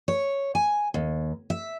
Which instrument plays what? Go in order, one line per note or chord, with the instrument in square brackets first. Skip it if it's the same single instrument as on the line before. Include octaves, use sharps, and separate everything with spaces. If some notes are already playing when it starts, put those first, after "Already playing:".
[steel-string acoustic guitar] C#5
G#5
D#2
E5